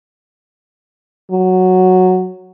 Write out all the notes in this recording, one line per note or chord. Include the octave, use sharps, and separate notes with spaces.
F#3